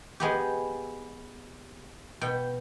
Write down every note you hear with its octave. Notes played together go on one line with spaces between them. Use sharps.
G#3 B3 G4
B2 G5